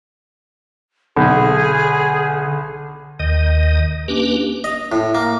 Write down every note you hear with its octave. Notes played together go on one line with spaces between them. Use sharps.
B1 D3 G#4
D#2 D#3 D#5
A#3 C#4 D4 G4 B4
D#5
A2
A#3